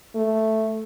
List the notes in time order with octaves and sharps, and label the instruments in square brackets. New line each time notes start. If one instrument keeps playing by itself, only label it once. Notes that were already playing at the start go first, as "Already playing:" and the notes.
[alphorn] A3